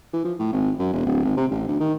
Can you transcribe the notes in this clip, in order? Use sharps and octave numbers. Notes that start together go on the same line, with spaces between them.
E3
F3
A2
G#1
F#2
E1
D1
G#1
C3
A1
D2
D#3